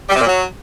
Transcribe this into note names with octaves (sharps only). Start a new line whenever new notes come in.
G3
C3
A#2
F#3